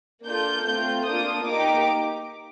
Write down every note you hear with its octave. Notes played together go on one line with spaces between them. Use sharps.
A#3 D4 F4 A4 G6
A3 C4 F4 G6
A#3 D4 F4 D#6
A#3 D#4 G4 D6